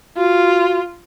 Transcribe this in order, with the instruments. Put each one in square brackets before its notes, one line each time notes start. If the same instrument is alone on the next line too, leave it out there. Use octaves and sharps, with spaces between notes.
[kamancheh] F4 [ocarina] F#4